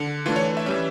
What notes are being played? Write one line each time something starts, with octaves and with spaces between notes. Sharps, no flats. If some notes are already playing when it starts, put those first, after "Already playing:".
Already playing: D3
E3 A3 D4 F4
C#5
E5
E3 G3 C#4